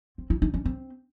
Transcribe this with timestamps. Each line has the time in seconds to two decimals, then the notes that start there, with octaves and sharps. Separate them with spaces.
0.18 C4
0.30 E4
0.42 D#4
0.54 C#4
0.65 C4